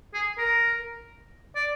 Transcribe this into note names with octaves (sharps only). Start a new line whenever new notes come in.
G#4
A#4
D5